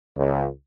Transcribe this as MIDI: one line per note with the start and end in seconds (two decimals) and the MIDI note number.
0.17 0.47 37